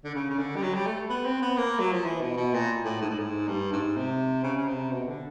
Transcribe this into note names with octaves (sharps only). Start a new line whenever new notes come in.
D3
C#3
C#3
D3
G3
F#3
G3
A3
B3
C4
B3
A#3
F#3
F3
E3
B2
B2
A#2
A2
G#2
A2
G#2
G2
G#2
C3
C#3
C#3
C3
B2
D3